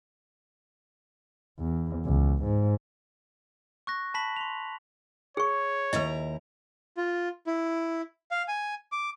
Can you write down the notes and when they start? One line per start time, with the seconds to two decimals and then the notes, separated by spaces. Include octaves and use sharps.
1.59 E2
2.06 C#2
2.44 G#2
3.87 C#6 F#6 A#6
4.14 A5 B5 B6 F#7
4.36 C6 F7
5.37 G#4 C#5 C#6
5.93 D#2 E4 B4 D#5 A#5
6.97 F4
7.47 E4
8.31 F5
8.48 G#5
8.92 D6